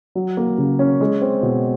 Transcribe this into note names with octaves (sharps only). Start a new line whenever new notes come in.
F#3
A#3
C#3
C#4
G#3
C4
B2